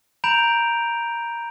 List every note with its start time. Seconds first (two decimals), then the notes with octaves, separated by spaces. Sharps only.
0.24 A#5 B5 G6 D7 F7